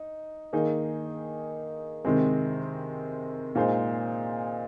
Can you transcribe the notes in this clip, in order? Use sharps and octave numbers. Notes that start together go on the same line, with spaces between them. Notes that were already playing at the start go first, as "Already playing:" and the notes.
Already playing: D#4
D#3 A#3 D#4 G#4
C3 D#3 G#3 C4
A#2 G#3 D#4 G#4 C5